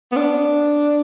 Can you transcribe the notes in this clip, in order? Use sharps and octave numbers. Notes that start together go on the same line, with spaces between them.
B3
D4